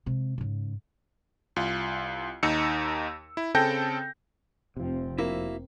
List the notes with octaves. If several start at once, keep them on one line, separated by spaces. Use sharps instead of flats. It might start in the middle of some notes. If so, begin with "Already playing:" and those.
C3 G#3
G#2 C#3
C2 F4
D#2 D#4 E6 C#7
E4
C#3 C4 A4 G5 G6 A#6
F1 C3 F3 C4
A#3 E4 F#4 E5